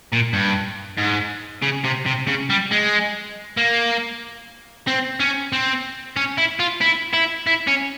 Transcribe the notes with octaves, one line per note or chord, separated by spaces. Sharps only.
A#2
G2
G#2
C#3
C3
C3
C#3
G3
G#3
A#3
C4
C#4
C4
C#4
E4
F4
E4
E4
E4
C#4